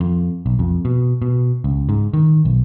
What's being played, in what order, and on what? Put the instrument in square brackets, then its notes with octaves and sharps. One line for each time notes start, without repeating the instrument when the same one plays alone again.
[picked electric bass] F2
B1
F2
B2
B2
C#2
G#2
D#3
B1